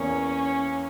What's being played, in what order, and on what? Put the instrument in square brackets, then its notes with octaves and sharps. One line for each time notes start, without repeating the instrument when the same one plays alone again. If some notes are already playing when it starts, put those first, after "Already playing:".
Already playing: [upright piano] E2 A#3 [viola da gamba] C#4